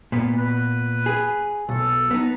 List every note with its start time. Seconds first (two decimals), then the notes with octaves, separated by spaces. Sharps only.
0.12 A#2 B3
0.39 B4
1.06 G#4
1.69 B1 A4
2.11 B3 D#4